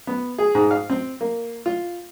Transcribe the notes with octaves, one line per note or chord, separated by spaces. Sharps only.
B3
G#4
G#2
F5
C4
A#3
F4